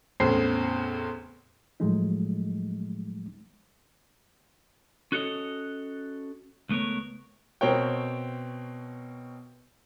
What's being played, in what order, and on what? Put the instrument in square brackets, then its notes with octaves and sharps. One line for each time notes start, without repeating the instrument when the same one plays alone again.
[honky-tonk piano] E2 A2 C#3 C4 C5 C7
[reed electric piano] A2 F3 F#3 G#3 A3 D#4
[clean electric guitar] C#4 F#4 A4 C#5 D#5
C#2 A3 B3 A#4 C#5
[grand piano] B2 C4 A#4 C#5 G5